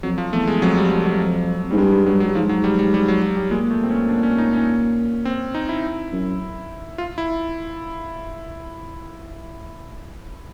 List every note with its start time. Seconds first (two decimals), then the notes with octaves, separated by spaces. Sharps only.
0.03 F2 F#3
0.18 F3
0.33 E2 A3
0.47 G#3
0.62 F2 F#3
0.77 G3
0.91 F#3
1.05 F#3
1.71 G#2 G3
1.77 G2 G#3
1.92 G3
2.06 G2 F#3
2.20 F#3
2.25 G2
2.35 G#2 F3
2.49 F#3
2.64 G3
2.79 G3
2.94 G3
3.08 F#3
3.22 F#3
3.37 G3
3.51 A#2 G#3
3.71 A3
3.84 C4
3.90 C#4
4.09 D4
4.23 C#4
4.38 D#4
4.53 C#4
5.25 C4
5.55 D#4
5.69 E4
6.12 F#2
6.98 F4
7.18 E4